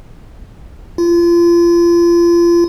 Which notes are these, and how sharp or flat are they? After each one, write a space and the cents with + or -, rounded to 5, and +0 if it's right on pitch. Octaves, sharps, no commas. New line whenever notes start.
F4 -30